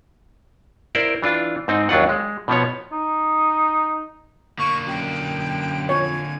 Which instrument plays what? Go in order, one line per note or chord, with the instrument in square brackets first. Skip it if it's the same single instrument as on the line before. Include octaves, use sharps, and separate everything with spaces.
[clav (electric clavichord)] E4 A#4 C5 D5
E3 D4 F4
G#2 C4 D#4
D#2 F#3 D4 F4 F#5
G#3
B2 F3 B3 C#5
[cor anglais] D#4
[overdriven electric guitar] D3 A#3 [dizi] C#6
[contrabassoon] F#2 [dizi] G5
[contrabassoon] F2 [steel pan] C#5 [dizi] G#5